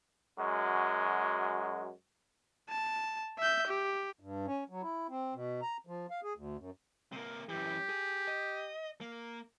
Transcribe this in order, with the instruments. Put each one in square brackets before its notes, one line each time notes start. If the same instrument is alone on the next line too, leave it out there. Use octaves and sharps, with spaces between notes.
[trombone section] F#2 G#3 F#4
[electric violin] A5
E5 G6
G4
[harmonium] G2
C#4
F#3
E4
C4
B2
A#5
F3
F5
G#4
D2
F#2
[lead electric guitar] C3 A#3
[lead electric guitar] F#2 E3 [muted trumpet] G4
[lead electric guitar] G#4
D#5
A#3